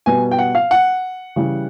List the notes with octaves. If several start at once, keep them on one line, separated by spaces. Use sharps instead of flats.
B2 G3 B3 G#5
G5
F#5
F5
F#5
C#3 E3 G3